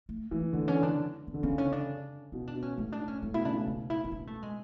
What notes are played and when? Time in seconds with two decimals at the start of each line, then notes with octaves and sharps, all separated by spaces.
0.09 A3
0.31 E3 A3
0.53 D3 A3
0.68 D3 C#4
0.83 D3 D4
1.27 B3
1.34 D3
1.43 C#3 B3
1.58 C#4
1.72 D4
2.32 B2 E4
2.47 D4
2.55 B2
2.62 C#4
2.77 A2 C#4
2.92 D4
3.08 C#4
3.23 A2 C#4
3.34 B2 E4
3.45 C#3 D4
3.56 A2
3.67 B2 D4
3.90 E4
4.04 E4
4.12 D4
4.27 A3
4.43 G#3